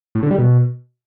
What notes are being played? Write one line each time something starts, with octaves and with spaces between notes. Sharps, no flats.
A2
D3
G3
B2